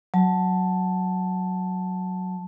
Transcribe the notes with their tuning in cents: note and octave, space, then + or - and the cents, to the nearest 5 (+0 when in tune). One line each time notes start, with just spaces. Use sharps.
F#3 +0 A5 +0